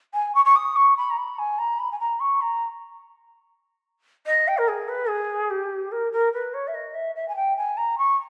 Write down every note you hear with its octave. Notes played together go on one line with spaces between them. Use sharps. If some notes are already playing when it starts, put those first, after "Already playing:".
G#5
C#6
C#6
D#6
C#6
B5
A#5
B5
G#5
A#5
B5
G#5
A#5
C#6
A#5
D#5
G5
A#4
G#4
B4
G#4
G4
A#4
A#4
B4
C#5
E5
D#5
E5
E5
G#5
G5
G#5
A#5
C#6